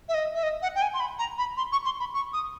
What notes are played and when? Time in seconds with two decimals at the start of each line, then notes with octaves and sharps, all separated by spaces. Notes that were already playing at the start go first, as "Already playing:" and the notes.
0.09 E5
0.14 D#5
0.34 E5
0.43 D#5
0.62 F#5
0.75 G5
0.82 G#5
0.94 C6
1.00 B5
1.19 A#5
1.38 B5
1.57 C6
1.72 C#6
1.85 C6
2.00 B5
2.14 C#6
2.33 D#6